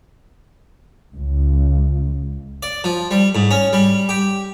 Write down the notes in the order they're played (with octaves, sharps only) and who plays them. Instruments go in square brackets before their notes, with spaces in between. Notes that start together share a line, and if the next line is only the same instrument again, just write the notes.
[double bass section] C#2
[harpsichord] D5
F3
G3
G#2
C#4
G3
G4